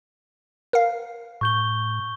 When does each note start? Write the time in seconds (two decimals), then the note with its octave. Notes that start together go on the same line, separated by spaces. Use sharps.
0.73 A#4 F5
1.41 A2 C#6 G6 G7